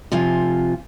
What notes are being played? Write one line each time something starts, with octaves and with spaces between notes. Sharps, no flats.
C3 F3 F4 G#5